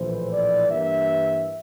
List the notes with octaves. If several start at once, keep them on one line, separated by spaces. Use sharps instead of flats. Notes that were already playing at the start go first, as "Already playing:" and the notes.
Already playing: A#1 A2 E3 C5
D5
G2 E3 A#3 E5